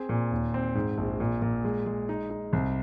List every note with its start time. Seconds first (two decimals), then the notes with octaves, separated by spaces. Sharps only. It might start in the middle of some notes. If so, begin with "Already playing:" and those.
Already playing: C4 G#4
0.09 A#2
0.32 D#2
0.54 C4
0.75 G#2
0.98 A#1
1.20 A#2
1.42 A#2
1.64 G#3
1.86 G#3
2.09 D#4
2.30 D#4
2.53 C2